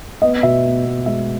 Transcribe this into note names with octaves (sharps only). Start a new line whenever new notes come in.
B3 D#5
B2 E5
B3
B3
G#3 E5